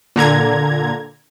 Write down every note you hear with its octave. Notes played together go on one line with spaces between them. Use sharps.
A#2 D3 A#5 G#6